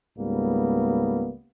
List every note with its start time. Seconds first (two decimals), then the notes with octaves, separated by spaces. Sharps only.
0.18 C#2 G#2 G3 A#3 B3